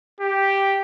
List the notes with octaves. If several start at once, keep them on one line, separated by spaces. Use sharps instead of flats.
G4